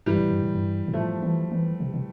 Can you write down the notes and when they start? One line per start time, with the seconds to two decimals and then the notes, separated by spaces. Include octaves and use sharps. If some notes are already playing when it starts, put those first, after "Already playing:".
0.06 G2 E3 G3
0.18 A2
0.30 G2
0.43 A2
0.55 G2
0.88 A#2
0.94 A2 F3 A3
1.23 E3
1.52 E3
1.80 C3
1.94 C3